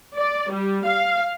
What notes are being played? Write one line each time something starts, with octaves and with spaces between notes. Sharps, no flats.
D5
G3
F5